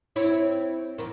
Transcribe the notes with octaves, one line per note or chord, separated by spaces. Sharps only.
C4 E4 C#5
E2 D#3